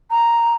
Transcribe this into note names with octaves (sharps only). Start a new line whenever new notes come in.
A#5